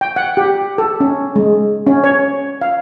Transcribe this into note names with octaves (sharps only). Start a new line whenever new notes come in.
G5
F#5
G4
A4
C#4
G#3
C#4
C#5
F5